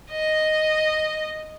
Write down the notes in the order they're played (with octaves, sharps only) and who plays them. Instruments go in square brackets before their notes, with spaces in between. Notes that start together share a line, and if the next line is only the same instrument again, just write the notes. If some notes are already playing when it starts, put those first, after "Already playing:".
[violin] D#5